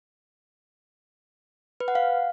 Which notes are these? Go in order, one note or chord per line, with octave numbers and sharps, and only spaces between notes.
B4
F#5
F5